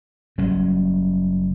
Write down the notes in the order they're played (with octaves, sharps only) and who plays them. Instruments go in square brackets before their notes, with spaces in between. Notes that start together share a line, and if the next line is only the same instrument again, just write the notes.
[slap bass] F#1 F#3 G3 C#4